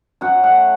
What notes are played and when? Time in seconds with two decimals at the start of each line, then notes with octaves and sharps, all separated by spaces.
0.21 F#2 F#5
0.44 A3 F#5